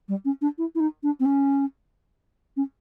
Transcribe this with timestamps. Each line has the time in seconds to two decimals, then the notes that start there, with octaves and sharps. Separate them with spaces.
0.08 G3
0.25 C#4
0.42 D4
0.58 E4
0.75 E4
0.80 D#4
1.03 D4
1.20 C4
1.25 C#4
2.57 C#4